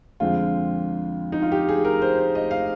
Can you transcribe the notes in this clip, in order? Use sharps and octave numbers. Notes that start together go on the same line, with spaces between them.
F2 D3 G#3 C4 F4
D#4
F4
G4
G#4
A#4
C5
C5
D#5
F5